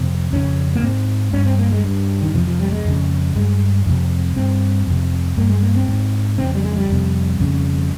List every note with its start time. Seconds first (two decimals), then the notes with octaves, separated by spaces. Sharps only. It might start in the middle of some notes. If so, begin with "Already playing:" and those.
Already playing: F2 C3 C4
0.33 F2 C#3 C#4
0.75 A#3
0.83 G#2 C4
1.33 G2 C#4
1.46 C4
1.59 A#3
1.72 G#3
1.84 G2
2.22 D#3
2.34 F2 C3 F3
2.47 F3
2.60 G3
2.72 G#3
2.85 F2 C#3
3.35 G2 G#3
3.86 F2 C3
4.36 G2 C4
4.87 F2 C3
5.38 G2 A#3
5.50 G#3
5.63 A#3
5.76 C4
5.88 G#2
6.38 F2 C#3 C4
6.54 G3
6.64 G#3
6.76 G3
6.89 F2 C3
7.39 F2 C#3